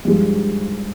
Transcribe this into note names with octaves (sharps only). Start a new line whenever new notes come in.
G2 F3 G#3